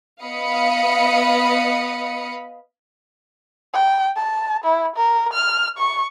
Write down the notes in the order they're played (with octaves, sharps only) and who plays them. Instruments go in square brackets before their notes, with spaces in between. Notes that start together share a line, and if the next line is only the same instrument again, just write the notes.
[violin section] B3 D#5 F5 B5 D#6 C#7
[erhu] G5
A5
E4
A#4
F6
C#6